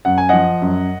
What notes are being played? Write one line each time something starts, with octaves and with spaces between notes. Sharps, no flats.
F#2 F#5
G#5
F3 D#5 F#5
F#2